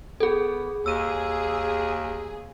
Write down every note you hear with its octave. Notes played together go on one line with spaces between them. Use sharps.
B3 G#4 A4
D#2 G#4 E6 D#7